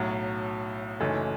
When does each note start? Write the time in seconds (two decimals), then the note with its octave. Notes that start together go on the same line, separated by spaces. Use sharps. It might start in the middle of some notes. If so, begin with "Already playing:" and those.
Already playing: B1 A2 F#3
1.00 F#1 F#2 E3 A3 D#4